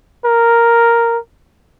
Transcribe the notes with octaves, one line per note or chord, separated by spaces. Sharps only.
A#4